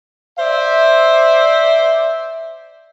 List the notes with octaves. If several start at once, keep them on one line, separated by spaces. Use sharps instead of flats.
C5 D5 E5